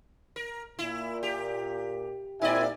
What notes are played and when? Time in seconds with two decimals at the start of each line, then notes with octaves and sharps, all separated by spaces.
0.36 A#4
0.79 A#2 E4
1.23 G4
2.41 A#2 C4 D#4 E4 D5 E5 G#5